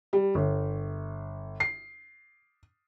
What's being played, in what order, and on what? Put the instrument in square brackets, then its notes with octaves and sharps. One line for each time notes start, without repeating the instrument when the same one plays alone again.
[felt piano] G3
G1
C7